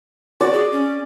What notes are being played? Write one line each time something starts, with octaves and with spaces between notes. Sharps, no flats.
F#4 D5
G#4
C#4